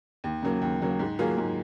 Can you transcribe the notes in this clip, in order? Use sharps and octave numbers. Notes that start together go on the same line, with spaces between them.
D#2
C#3 F#3 A#3
D#2
C#3 F#3 A#3
G#2
F#3 A#3 F4 G#4
G#2